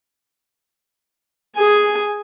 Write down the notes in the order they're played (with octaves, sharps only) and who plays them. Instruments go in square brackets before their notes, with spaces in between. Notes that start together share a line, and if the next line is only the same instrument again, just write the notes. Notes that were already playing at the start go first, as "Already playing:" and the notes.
[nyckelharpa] G#4 G#5